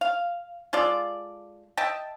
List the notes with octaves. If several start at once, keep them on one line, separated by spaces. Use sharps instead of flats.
F5
G#3 F4 A4 D5
D#5 E5 G5 A5